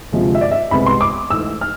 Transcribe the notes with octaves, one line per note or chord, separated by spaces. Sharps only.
D2 C3 F3 G#3
E5
D5
E5
C2 C3 G#3 B3 B5
C6
D6
G#2 E3 A3 E6
F6